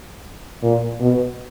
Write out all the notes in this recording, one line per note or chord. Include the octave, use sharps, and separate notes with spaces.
A#2
B2